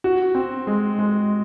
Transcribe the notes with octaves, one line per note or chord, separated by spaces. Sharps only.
F#4
C4
G#3
G#3